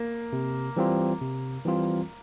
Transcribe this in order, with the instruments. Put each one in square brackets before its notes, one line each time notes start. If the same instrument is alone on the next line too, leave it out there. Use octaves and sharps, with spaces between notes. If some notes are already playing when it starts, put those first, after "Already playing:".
Already playing: [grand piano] A#3
[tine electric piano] C3
E3 G3 C4 F4
C3
E3 G3 C4 F4